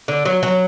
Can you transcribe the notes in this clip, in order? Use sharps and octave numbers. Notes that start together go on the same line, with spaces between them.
D3
F#3
F#3